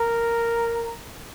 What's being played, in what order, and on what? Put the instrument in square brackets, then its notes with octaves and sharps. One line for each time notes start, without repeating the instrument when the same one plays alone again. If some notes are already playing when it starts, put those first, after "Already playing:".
Already playing: [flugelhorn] A#4